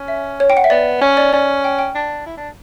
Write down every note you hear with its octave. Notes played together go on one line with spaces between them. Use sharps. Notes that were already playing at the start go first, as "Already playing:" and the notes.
Already playing: C#4
E5
C#5
G5
F#5
E5
B3 D5
C#4 C#5
D5
C#4 D5
G5
G5
D4
E4
D4